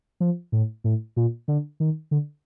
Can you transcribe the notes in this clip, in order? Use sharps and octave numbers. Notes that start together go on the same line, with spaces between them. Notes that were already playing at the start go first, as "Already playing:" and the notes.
F3
A2
A2
A#2
D3
D#3
D3